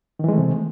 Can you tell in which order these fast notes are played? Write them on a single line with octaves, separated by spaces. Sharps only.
D#3 E3 G#3 A3 C3